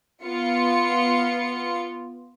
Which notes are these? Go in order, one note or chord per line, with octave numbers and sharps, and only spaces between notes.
B3 F4 C#7